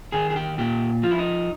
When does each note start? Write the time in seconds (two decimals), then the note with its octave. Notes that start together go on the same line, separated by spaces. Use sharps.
0.12 D#3 G#4
0.30 G#4
0.36 G4
0.58 A#2 G4
1.03 F3 F4
1.11 E4
1.19 D#4